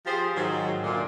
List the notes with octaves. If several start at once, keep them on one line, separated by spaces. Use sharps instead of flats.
F3 G4 G#4 C5
G#2 D#3 F#3
D2 A#2